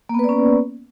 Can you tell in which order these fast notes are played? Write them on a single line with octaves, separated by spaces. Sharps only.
A#3 B3 B4 D5 C#4